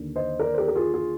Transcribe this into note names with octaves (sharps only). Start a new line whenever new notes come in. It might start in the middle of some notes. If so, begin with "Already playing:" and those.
Already playing: D#2 D3
C5 D#5
A#4 D5
C5
G4 A#4
A#4
F4 G#4
F4 G#4